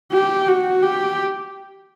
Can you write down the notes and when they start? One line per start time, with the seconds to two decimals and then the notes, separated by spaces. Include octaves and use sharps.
0.12 G4
0.48 F#4
0.82 G4